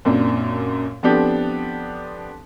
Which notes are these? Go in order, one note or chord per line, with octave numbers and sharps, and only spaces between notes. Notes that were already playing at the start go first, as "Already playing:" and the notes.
F#2 A#2 C4 D4
F3 B3 C4 D4 G4 A4